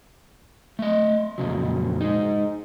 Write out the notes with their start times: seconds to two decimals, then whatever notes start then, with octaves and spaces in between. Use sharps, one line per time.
0.79 A3 D#5
1.38 F2 A#2 C#3 F#3
2.01 G#3 D#4